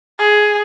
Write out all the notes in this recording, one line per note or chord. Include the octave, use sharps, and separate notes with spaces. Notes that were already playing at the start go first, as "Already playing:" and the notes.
G#4